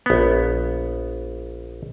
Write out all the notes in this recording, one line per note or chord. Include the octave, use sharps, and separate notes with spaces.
A#1 B3